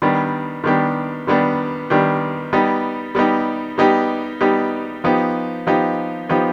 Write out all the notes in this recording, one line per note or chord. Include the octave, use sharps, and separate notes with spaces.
D#3 G3 B3 D4 G4
D#3 G3 B3 D4 G4
D#3 G3 B3 D4 G4
D#3 G3 B3 D4 G4
G3 B3 D#4 G4
G3 B3 D#4 G4
G3 B3 D#4 G4
G3 B3 D#4 G4
F3 B3 D#4 G4
F3 B3 D#4 G4
F3 B3 D#4 G4